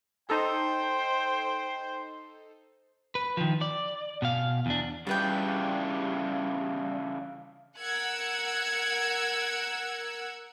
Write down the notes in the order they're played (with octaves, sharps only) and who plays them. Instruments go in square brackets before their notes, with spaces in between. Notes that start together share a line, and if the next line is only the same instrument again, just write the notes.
[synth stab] D#4 A4 [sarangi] C5 [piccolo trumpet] G5
[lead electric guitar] B4
D#3 F3
D5
B2 F5
E2 D4
[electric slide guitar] C#3 E3 D4 [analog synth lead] G3 [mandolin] F4 B4 G5 [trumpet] F5
[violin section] A#4 F#5 E6 F#6 G#6 C#7